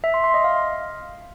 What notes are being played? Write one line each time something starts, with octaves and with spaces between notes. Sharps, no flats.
E5
C6
C6
D#5
F5